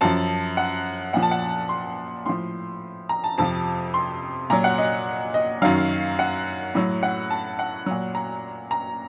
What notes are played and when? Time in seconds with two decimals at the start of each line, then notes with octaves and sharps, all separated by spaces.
0.01 F#2 F3 A5
0.57 F#5
1.13 A#2 F3 F#5
1.22 A5
1.31 F#5
1.69 C6
2.26 A2 F3 C6
3.09 A#5
3.24 A5
3.38 F2 C3 F3 A5
3.94 C6
4.50 A#2 F#3 A#5
4.64 F#5
4.78 D#5
5.34 D#5
5.62 F#2 D#3 F#3 F5
6.19 F#5
6.75 A2 F#3
7.03 F#5
7.30 A5
7.59 F#5
7.86 A#2 F#3
8.15 A#5
8.71 A#5